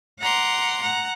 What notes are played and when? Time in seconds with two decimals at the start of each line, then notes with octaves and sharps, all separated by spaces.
0.20 F#5 A#5 C6 D6
0.82 F#5 A#5